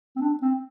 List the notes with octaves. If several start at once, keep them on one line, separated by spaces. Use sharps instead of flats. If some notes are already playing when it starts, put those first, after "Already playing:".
C4
D4
C4